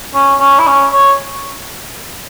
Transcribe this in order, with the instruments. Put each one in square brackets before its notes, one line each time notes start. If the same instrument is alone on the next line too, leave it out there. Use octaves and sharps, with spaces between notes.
[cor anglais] C#4
C#4
E4
C#4
C#5